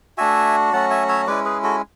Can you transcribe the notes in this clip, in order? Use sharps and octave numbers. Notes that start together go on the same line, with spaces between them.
A3 D4 F#4 E5 G#5
F#3 A3 C#4 F#4 F#5 A5
E5 G#5
C#5 E5
G#3 C#4 E4 B4 D5
G#4 B4
F#4 A4